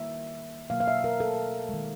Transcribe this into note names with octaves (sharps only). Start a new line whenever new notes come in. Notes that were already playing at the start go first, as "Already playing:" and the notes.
Already playing: D#3 G3 A#3 E5
B2 F#3 A#3 F5
F5
E5
A#4
A4
D#3 G#3